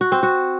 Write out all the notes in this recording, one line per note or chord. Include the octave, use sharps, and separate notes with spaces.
F#4
C4
F#4